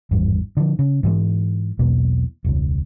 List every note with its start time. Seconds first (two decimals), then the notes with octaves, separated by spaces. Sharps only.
0.11 G#1 E2 G2
0.57 D3 F3
0.79 C#3
1.03 G#2 E3 G#3
1.79 B1 E2 B2 A#3
2.44 E1 C#2